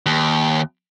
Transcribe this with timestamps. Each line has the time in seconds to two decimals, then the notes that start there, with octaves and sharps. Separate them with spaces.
0.06 D#2